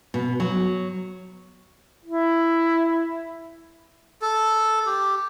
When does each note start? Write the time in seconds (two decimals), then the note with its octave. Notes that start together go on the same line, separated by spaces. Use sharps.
0.14 B2
0.40 F#3
2.05 E4
4.22 A4
4.86 G4